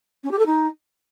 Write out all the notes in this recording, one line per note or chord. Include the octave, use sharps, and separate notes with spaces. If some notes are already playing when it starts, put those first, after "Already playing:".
C#4
G4
A4
D#4